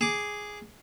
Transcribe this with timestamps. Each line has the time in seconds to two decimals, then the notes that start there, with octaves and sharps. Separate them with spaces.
0.01 G#4 D6